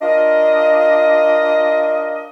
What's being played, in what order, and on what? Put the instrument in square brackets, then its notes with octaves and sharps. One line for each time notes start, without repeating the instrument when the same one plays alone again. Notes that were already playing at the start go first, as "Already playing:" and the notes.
[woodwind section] D4 F4 A#4 D#5